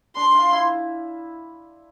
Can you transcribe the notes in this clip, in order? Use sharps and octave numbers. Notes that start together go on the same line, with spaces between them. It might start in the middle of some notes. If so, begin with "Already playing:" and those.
D4 C6
F4
E4